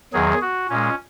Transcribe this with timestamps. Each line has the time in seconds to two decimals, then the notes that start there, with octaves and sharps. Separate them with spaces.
0.13 E2 D#3 F#3 G#4
0.41 F#4
0.69 A#2 G#3 C#4